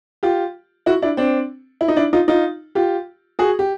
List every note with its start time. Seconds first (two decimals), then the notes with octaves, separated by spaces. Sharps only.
0.23 F4 G4
0.86 E4 F#4
1.02 D4 E4
1.17 C4 D4
1.81 E4
1.88 D#4
1.96 D4 E4
2.13 D#4 F4
2.28 D#4 F4
2.75 F4 G4
3.39 F#4 G#4
3.59 G4